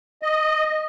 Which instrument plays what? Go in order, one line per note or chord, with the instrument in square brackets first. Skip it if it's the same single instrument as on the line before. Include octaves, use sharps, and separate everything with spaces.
[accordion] D#5